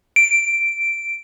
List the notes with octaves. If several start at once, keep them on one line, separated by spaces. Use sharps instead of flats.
D7